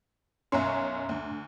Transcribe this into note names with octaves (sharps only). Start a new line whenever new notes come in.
B1 F#2 C#4 E5 A#5 C6
D2